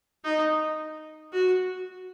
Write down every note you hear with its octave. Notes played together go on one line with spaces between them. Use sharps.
D#4
F#4